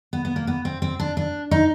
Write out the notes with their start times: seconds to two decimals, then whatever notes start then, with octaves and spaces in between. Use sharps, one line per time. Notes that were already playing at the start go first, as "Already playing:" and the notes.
0.13 B3
0.25 B3
0.36 A#3
0.47 B3
0.65 C4
0.82 C4
1.00 D4
1.17 D4
1.51 D#4